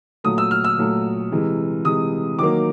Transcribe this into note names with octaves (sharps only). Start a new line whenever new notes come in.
A#2 F#3 A3 D#6
E6
F6
E6
A#2 F#3 A3
C3 E3 G#3
C3 E3 G#3 D#6
D#3 F#3 A#3 D6